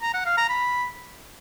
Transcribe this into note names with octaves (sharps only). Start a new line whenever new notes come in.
A#5
F#5
F5
A#5
B5